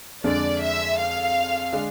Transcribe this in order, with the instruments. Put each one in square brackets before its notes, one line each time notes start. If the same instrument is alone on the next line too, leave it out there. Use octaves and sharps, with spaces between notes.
[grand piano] F2 D3 G#3 D4 [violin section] D5
[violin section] E5
F5
[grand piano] D3 G#3 D4